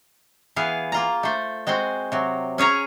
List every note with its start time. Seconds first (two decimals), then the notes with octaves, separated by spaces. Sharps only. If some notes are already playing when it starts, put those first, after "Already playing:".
0.56 E3 B3 G#4 F5
0.92 A#3 F4 A#5
1.23 A3 C5
1.67 G#3 C4 F#4 C5
2.12 C3 F#3
2.58 C#4 G#4 C#5 A#5